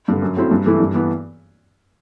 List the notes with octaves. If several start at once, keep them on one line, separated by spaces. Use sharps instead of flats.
G2 D3
F#2
F#3 A3 C4 E4
G2
E3 A3 E4
G2
E3 B3